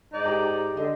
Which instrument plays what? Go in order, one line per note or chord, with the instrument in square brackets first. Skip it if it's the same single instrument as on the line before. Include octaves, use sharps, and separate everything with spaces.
[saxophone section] G#2 D#4 D5
[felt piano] G4 A#5
[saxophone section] D3 [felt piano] D#5